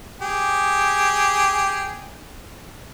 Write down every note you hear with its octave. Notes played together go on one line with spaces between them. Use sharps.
G4 G#4